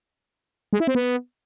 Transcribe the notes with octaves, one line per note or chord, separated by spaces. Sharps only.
G#3
E4
C4
B3